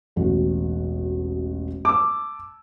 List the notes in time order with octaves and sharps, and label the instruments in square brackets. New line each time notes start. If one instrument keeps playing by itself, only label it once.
[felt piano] E1 A1 F#4
[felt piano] A5 E6 [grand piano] D6